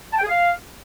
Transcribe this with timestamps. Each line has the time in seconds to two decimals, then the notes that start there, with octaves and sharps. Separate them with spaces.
0.12 A5
0.18 G5
0.23 G#4
0.29 F5